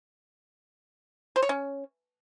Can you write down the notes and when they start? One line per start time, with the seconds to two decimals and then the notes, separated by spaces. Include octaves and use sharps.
1.36 C5
1.42 C#5
1.49 C#4